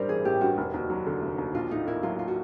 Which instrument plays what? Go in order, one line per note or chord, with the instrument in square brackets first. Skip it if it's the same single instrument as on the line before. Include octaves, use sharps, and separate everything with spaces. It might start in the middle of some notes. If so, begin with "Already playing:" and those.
Already playing: [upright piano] A1 G2 G3 [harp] A#4 C5 D5
[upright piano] E3 [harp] G#4
[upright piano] A1 [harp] G4
[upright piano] G2 [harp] F#4
[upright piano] F1
D#2
F#3
D3
F1
D#2
[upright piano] A#1 [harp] F4
[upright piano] A2 [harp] D#4
[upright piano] A#3 [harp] E4
[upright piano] F#3 [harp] F4
[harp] F4
F#4